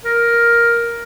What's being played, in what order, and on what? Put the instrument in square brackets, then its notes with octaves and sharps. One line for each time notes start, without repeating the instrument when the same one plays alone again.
[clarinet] A#4